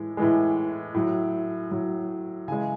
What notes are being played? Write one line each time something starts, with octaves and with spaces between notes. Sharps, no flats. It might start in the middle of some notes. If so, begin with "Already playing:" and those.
Already playing: A2 E3 G#3
A2 E3 G#3
A2 F#3
A2 F#3
C#3 E3 G#3 G#5